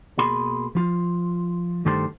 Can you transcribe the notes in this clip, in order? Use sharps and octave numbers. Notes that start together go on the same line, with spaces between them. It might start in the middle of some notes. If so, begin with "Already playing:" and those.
B2 A#3 G#4 B5 C6
F3 F4
G2 D#3 A3 G4 A4 C5